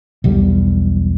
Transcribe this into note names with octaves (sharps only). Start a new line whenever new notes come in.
B1 E2 G3